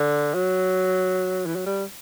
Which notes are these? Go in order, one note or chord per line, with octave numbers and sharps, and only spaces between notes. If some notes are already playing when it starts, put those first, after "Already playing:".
Already playing: D3
F#3
E3
F#3
G3